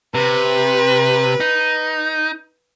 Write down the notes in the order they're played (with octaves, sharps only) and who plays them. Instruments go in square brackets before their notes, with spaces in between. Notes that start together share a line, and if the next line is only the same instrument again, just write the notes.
[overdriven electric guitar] C3 [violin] B4
[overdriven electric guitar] D#4